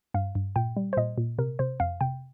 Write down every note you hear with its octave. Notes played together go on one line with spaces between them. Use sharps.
G2 F5
G2
A#2 G5
G3
C5
A#2 D#5
A#2
C3 A#4
C3 C5
F2 F5
C3 G5